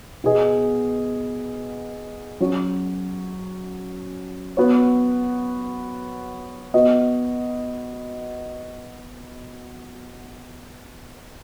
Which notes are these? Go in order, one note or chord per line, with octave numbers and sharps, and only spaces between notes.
B2 B3 G#4 D#5
F#3 C#4 F#4 C#5
B3 F#4 C#5
B3 F#4 D#5